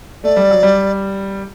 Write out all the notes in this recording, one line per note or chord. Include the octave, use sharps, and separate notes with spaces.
A3 D5
G3
F#3
G3